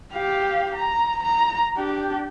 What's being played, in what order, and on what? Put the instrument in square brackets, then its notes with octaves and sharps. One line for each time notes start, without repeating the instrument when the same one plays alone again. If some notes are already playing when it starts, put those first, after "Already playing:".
[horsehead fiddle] G4 F5
A#5
A#5
D4 G4